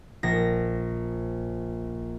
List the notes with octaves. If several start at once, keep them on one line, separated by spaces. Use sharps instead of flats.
A#1 A#6